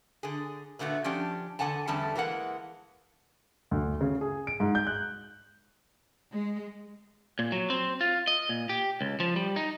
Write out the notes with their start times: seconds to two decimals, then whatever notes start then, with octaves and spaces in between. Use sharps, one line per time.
0.23 D3 G#4
0.79 A#2 D3 A3 B3 F#4
1.04 F3 C#4 D4 G4
1.59 E2 D3 F#5 G#5 A5
1.87 E2 D3 G3 A3 C#4 A5
2.16 E3 G#3 A#3 E4 F#5
3.71 D2
4.01 C#3
4.21 G#4
4.47 D7
4.60 G#2
4.75 G6
4.87 F#6
6.33 G#3
7.39 A#2
7.52 F#3
7.70 C4
8.01 F4
8.27 D#5
8.49 A#2
8.69 G4
9.01 C#2
9.20 F3
9.36 G3
9.56 D#4